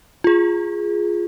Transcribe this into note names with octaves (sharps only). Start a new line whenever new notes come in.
F4 G#4